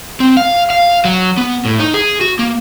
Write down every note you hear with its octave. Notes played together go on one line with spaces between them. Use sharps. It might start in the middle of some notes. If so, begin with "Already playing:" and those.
C4
F5
F5
F#3
B3
A2
D#4
G#4
F#4
A#3